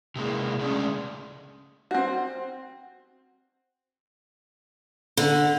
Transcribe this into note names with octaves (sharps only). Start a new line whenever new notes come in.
C3 G#3 A#3 E4
C#3 G#3 A3 C#4 D4
C4 F#4
D3